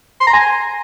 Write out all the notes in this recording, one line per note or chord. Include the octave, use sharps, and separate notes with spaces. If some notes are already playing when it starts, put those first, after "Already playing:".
C6
A#5
G#5